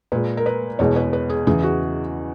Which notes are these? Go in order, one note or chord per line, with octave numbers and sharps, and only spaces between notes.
A#2 G#3 B4
A#4
B4
E2 B2 G#3 C#5
B4
B4
G#4
E2 C#3 E3 G#4
F#4